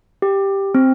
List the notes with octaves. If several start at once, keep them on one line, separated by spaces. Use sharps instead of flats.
G4
C4